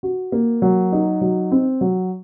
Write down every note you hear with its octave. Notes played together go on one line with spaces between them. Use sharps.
F#4
A#3
F#3
D#4
F#3
C4
F#3